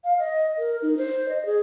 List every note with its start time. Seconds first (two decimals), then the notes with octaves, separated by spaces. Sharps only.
0.04 F5
0.19 D#5
0.58 A#4
0.82 D#4
0.98 C5
1.29 D#5
1.46 G#4